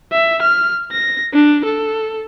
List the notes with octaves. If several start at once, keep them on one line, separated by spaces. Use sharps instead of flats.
E5
F6
A#6
D4
A4